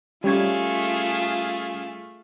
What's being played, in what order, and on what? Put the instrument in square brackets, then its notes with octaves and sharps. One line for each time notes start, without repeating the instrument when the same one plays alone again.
[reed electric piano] G3 C#4 G#6 [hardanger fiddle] A3 [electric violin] F4 G#4